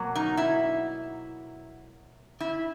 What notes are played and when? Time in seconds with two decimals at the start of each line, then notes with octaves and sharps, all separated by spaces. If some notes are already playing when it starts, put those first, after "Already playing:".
Already playing: B2 F#3 A#3
0.15 D#4
0.37 E4
2.40 E4